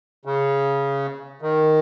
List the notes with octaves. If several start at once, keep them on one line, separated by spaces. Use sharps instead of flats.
C#3
D#3